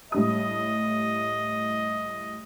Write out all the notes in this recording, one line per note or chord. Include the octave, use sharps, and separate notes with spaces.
A2 G3 D#5 D#6